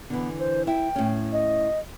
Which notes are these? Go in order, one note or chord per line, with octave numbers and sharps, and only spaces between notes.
D3 E3 B3
C5
E4 G5
A2 C#4
D#5